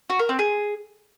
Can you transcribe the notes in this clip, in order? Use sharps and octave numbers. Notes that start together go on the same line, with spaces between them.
F#4
A#4
C4
G#4